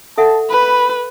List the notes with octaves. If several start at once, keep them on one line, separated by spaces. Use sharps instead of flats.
A4 E5 F#5 A5
B4 B5